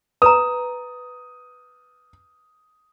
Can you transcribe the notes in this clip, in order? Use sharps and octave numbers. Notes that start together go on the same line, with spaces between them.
B4 A#5 D#6